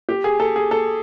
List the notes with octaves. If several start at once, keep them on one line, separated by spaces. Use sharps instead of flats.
G4
G#4
A4
G#4
A4